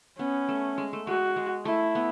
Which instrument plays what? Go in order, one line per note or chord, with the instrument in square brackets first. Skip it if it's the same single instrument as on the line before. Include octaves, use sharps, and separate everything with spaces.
[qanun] B3 [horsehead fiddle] C#4
[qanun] A3
G#3
A3
[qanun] G#3 [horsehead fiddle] F#4
[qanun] G#3
[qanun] A3 [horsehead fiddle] E4
[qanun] B3